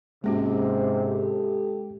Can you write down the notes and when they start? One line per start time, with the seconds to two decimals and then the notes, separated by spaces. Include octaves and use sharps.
0.24 G#2 C3 G#3 A#3 C#4 F#4
0.95 G4 A4